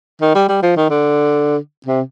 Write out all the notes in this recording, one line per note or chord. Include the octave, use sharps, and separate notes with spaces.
D#3
G3
G3
F3
D#3
D3
C3